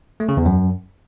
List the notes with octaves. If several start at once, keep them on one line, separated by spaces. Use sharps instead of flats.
A3
C#3
E2
F#2